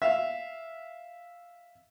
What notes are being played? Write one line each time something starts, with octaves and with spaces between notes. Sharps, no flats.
E5 F5